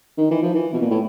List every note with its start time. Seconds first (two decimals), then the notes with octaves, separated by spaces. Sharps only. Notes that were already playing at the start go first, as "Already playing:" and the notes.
0.17 D#3
0.31 E3
0.42 F3
0.55 E3
0.73 B2
0.81 A#2
0.90 A2